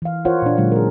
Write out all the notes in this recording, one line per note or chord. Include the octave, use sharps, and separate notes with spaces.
E3 F5
F4 A#4 C5 C#5 F5 F#5
A#2 D4
A#2 D3 F#3 G#3 D4 D#4
G#4 A#4